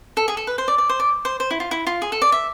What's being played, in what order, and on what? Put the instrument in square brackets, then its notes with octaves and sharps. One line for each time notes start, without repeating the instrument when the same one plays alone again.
[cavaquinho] A4
G#4
A4
B4
C5
D5
D5
C5
D5
C5
C5
E4
F4
E4
F4
G#4
A4
D5
E5